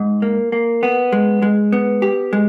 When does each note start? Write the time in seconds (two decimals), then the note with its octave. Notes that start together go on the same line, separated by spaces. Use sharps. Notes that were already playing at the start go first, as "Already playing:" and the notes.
Already playing: G#2
0.22 A#3
0.52 A#3
0.83 B3
1.12 G#3
1.42 G#3
1.72 B3
2.02 G4
2.33 G#3